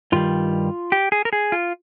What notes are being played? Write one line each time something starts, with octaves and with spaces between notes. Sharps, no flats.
G2 D#3 G3 F4
G4
G#4
A#4
G#4
F4